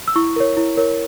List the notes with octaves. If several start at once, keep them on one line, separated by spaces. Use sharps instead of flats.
E6
E4 C#6
A#4 C#5
E4
A#4 C#5